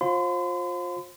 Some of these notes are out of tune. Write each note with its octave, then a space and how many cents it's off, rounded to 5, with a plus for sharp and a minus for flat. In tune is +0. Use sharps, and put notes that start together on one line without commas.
F4 +25 C5 +30 C6 -45